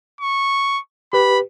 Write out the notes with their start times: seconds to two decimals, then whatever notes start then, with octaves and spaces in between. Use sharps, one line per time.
0.21 C#6
1.13 G4 B4 B5